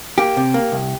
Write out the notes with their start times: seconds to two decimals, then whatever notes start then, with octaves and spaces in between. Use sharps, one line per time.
0.18 A#3 G4
0.37 C3
0.54 A#3
0.72 C2